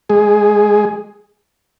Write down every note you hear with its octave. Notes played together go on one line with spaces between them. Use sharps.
G#3 G#4